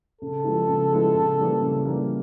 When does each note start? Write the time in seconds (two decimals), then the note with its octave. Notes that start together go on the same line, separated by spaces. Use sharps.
0.21 C#3 A4
0.44 F3 G#3 B3 E4
0.68 C#3
0.92 F3 G#3 B3 E4
1.15 C#3
1.38 E3 G3 A#3
1.61 C#3
1.85 E3 G3 A#3